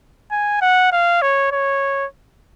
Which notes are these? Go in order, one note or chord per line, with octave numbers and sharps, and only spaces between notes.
G#5
F#5
F5
C#5
C#5